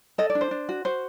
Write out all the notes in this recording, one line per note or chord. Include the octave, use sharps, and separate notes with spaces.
A4 D#5
D5
D4
C5
D4
F#4
F#4 C5